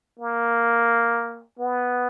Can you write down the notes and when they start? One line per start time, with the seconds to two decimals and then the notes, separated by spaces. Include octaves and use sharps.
0.19 A#3
1.59 B3